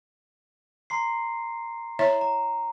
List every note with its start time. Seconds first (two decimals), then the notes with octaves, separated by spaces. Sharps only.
0.90 A#5 C6 C7
1.99 E4 C#5 E5 A#5
2.21 A#5